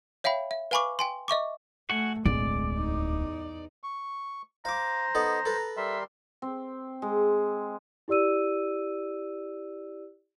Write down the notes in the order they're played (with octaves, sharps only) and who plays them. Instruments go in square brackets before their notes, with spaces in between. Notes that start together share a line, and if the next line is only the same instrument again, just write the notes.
[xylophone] C#5 E5 F5 G5 B5
E5
B4 F5 G#5 B5 C#6 D6
G5 G#5 C6
D#5 E5 C#6 D6
[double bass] A3 [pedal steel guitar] F#4 F#5 G#5
[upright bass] D1 [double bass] B1 G#3 [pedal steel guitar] D5
[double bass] E2 D#4
[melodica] C#6
[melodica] C5 [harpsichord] F5 D6 [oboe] A#5
[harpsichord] B3 D#4 A4
A4 B4
[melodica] G3 A#4 C6 [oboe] E5
[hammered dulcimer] C4
G#3
[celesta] E4 G4 D5 E6 D#7